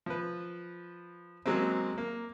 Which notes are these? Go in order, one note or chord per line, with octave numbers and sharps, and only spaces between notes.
F3 B4
F#3 G#3 A#3 C4
A#3